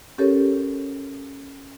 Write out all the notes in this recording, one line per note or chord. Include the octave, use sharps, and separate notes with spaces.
C#4 G4 A4 A#4 C#5